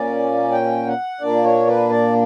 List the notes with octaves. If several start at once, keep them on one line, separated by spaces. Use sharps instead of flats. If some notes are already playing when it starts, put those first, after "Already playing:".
Already playing: A#2 A#3 C#4 D5
G5
F#5
A#2 A#3 D4 D5
C#5
B4
D5